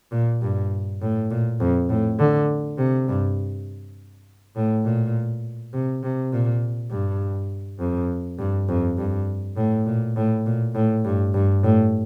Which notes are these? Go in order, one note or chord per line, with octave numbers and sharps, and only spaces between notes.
A#2
G2
A2
A#2
F2
A2
D3
C3
G2
A2
A#2
C3
C3
A#2
G2
F2
G2
F2
G2
A2
A#2
A2
A#2
A2
G2
G2
A2